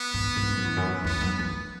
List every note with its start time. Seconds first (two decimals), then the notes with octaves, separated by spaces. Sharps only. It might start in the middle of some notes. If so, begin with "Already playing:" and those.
Already playing: B3
0.14 G#2
0.36 G#2
0.51 F#2
0.64 E2
0.77 F#2
1.04 E2 B3
1.21 F#2
1.39 E2